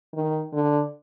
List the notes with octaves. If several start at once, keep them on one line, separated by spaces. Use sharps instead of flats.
D#3
D3